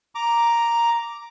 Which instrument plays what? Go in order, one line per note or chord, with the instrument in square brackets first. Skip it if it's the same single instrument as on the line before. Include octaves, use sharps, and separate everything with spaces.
[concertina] A#5 D6